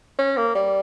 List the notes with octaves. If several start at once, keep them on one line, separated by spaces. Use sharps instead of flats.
C#4
A#3
G3